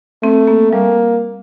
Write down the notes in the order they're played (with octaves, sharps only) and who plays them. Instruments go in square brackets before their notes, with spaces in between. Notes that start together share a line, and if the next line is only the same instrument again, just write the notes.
[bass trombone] A3 [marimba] C4
[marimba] A#3
[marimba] G3 [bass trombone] A#3